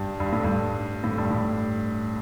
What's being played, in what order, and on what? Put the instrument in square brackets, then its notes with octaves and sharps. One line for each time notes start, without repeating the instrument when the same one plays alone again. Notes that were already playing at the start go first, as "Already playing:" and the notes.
Already playing: [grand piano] G2
G2
A2
G2
A2
G2
A2